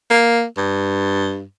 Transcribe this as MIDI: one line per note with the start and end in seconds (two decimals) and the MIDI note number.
0.11 0.45 58
0.57 1.44 43